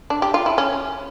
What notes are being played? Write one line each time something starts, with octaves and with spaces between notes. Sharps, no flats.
D4
G4
F4
E4
C#4